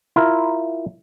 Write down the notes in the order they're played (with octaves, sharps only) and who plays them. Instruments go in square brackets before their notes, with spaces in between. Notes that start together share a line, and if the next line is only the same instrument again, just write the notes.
[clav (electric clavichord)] E4 F4 A#4